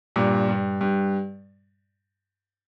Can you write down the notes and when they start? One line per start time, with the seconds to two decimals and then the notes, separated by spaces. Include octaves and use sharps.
0.16 G2 A#2
0.49 G2
0.81 G2